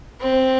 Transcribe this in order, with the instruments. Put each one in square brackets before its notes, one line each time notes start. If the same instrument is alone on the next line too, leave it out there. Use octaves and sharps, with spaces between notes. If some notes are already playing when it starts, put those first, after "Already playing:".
[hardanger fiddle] C4